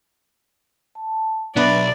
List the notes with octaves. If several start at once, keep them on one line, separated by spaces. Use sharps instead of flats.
A5
B1 F#3 B3 D4 B4 D5 E5 B5